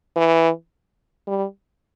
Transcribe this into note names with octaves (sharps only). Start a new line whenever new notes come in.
E3
G3